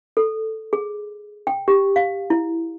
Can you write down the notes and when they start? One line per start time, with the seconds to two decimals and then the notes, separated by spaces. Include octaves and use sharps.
0.17 A4
0.73 G#4
1.47 G5
1.68 G4
1.96 F5
2.30 E4